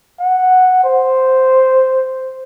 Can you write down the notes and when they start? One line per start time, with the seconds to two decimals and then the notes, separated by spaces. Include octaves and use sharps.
0.20 F#5
0.84 C5